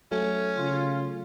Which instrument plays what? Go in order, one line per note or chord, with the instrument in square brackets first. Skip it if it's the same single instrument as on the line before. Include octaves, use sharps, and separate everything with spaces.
[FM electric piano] F#3 A3 [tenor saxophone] C#4
[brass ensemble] C#3 F4